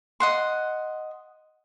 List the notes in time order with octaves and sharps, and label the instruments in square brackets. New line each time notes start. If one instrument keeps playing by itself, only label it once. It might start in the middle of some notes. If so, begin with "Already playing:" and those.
[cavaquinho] D#5 F#5 C6